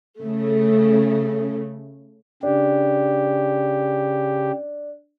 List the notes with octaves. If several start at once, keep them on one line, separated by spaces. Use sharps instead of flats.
C#3 A3
C#3 D4 G4